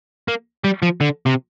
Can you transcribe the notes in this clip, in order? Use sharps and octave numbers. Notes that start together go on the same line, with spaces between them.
A#3
G3
F3
D3
C3